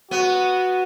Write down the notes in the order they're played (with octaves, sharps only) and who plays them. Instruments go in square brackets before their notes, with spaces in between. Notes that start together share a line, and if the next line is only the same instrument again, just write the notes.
[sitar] B3 [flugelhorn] F#4